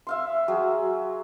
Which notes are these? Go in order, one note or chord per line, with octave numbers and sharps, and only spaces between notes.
E5 F5 C6
F#3 G#4